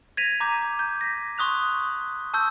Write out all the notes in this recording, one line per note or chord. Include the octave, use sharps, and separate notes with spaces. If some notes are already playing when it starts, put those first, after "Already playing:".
G#6 A#6 B6 D#7 F7
A#5 D6 G6
G6
A#6 B6
C6 C#6 D#6 F#6 F7
A5 C#6 E6 G6